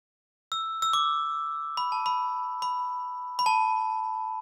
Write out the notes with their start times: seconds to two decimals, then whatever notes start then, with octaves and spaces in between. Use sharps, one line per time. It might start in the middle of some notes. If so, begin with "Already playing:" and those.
0.52 E6
0.82 E6
0.93 D6
1.77 B5
1.92 A5
2.06 B5
2.62 B5
3.39 B5
3.46 A5